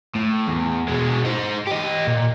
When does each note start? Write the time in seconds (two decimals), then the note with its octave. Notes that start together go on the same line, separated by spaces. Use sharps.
0.15 A2
0.47 E2
0.88 B2 G#3
1.25 D#4 C5
1.67 G4 D#5
2.07 A#2